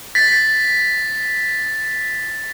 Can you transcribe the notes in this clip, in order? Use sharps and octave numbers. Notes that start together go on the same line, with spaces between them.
A6 B6